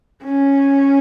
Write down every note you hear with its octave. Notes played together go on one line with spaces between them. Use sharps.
C#4